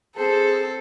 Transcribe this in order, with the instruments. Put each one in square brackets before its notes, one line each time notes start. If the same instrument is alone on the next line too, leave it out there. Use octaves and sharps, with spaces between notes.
[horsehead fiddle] C4 C5 [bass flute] G#4 [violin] A4